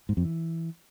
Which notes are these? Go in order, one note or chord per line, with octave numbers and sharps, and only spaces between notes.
G#2
F2
E3